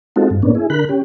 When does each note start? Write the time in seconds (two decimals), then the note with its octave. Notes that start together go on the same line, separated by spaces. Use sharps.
0.16 G#3 C4 D#4 F4 F#4 A4
0.30 G2
0.43 A2 A#3 B3 C#4 D4
0.55 E4 G#4
0.70 D3 A#4 B5 F#6
0.89 C#4 G4